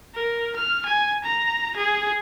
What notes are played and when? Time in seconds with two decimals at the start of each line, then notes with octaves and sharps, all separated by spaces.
0.15 A#4
0.56 F6
0.86 G#5
1.24 A#5
1.76 G#4